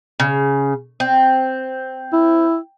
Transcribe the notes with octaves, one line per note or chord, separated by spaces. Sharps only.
C#3
C4
E4